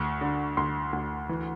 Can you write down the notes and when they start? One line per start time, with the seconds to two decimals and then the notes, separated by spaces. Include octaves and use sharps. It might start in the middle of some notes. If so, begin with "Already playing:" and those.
Already playing: D2 C#6
0.21 D3
0.57 D2 C6
0.93 D2
1.29 E3